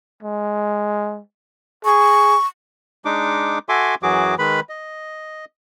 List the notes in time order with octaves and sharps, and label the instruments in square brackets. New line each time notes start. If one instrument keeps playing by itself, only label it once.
[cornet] G#3
[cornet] G#4 [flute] C#6
[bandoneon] G#3 D4 D#4 D6
F#4 A4 E5 G#5 C6 D6
F#2 E3 F#3 F#4 G#4 D6
D#3 G#3 B4 B5
D#5